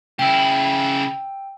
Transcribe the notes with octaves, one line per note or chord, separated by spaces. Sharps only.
C#3 E4 G5 E6